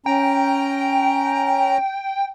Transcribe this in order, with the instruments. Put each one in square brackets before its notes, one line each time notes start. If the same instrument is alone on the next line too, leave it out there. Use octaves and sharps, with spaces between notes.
[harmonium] C#4 A#5 [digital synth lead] G5